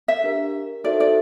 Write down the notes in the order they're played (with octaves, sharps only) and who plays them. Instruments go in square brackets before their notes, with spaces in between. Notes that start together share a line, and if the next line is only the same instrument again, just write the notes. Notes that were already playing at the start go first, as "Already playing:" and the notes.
[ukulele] E5
[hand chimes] D4 G4 A#4
[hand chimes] D#4 F#4 A4 C5 E5 [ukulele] D5
[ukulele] D5